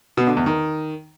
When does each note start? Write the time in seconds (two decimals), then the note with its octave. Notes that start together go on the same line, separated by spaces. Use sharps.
0.17 B2
0.27 D3
0.37 E2
0.46 D#3